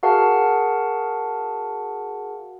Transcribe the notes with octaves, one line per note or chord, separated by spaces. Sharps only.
F#4 G#4 A#4 F5 F#5 A5